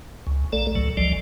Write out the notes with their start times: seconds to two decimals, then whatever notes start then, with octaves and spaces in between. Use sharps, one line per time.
0.27 C#2
0.52 A#1 A3 A4 D5
0.75 C#2 A2 F#3
0.97 G#1 C#2 F3 G3 D5